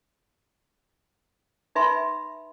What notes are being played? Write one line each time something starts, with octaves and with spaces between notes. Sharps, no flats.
D#4 B4 E5 G#5 B5 C6